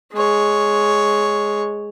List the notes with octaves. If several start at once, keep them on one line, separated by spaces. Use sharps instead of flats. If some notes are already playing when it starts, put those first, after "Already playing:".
G#3 C#5